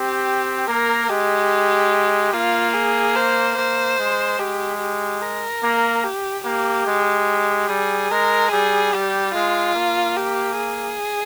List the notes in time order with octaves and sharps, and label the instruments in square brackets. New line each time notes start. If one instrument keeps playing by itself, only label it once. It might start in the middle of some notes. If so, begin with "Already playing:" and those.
Already playing: [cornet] C4 [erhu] G4
[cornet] A#3 [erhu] A#4
[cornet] G#3 [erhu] G4
[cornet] A#3 [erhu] F4
[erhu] G#4
C5
[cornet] A#3 [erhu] C5
[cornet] G#3
[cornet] G#3 [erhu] G4
[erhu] G4
A#4
[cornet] A#3
[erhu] G4
[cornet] A#3 [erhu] G4
[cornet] G#3
[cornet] G3 [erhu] G#4
[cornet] G#3 [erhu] A#4
[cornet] G3 [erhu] G#4
[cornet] G3 [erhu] G4
[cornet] G#3 [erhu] F4
[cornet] A#3
[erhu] G4
G#4